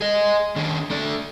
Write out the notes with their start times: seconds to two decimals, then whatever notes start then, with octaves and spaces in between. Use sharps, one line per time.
0.01 G#4 D#5
0.56 D#3 D4 G#4
0.90 A3 D4 D5